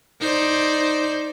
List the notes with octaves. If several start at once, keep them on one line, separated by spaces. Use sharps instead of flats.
D#4 C5 D5